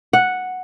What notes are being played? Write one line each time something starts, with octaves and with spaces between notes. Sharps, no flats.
F#5